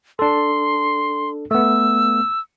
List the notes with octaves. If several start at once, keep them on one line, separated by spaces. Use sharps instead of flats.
D4 A4 C6
A3 B3 E6